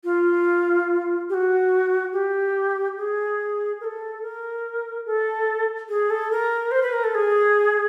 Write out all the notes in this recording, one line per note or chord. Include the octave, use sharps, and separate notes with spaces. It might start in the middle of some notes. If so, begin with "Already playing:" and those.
F4
G4
F#4
G4
G#4
A#4
A4
A#4
A4
G#4
A4
A#4
C5
B4
A#4
A4
G#4